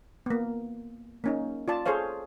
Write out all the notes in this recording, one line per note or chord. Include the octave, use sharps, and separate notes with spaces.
A#3 B3
A#3 C#4 D#4
F4 D5 A5
G#4 A4 C5 C#5 F5